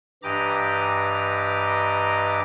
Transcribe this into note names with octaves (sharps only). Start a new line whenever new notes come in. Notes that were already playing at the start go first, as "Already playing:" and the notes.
G2 E3 G4 D#5 A#5 D6